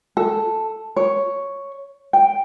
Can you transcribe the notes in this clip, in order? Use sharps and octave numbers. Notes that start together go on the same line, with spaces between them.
A4
C#5
G5